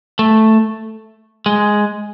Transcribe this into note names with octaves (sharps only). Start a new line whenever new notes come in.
A3
G#3